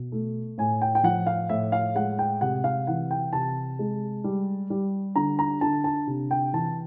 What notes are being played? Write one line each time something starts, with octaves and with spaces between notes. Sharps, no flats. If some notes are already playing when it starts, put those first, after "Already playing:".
Already playing: B2
A3
A2 G#5
G5
G5
F3 F#5
F5
A2 E5
F5
G#3 F#5
G5
C3 F#5
F5
E3 F#5
G5
C3 A5
G#3
G3
G3
D3 A#5
A#5
D3 A5
A5
C3
G5
E3 A5